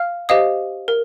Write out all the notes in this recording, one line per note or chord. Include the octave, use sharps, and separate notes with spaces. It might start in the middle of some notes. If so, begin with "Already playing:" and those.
Already playing: F5 F6
G4 C5 D#5 F5 D#6
A#4